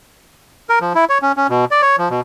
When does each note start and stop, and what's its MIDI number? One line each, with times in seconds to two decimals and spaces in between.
0.69 0.79 70
0.81 0.93 53
0.95 1.05 64
1.09 1.18 73
1.22 1.32 61
1.37 1.47 61
1.50 1.65 47
1.71 1.82 74
1.82 1.96 73
1.99 2.09 53
2.10 2.21 47